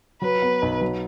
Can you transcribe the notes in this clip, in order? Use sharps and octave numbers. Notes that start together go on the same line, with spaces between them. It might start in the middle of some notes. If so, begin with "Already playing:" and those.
F#3 B4
B3
B1
F#3